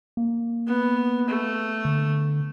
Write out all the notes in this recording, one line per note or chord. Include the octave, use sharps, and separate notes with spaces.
A#3
B3
A3
D3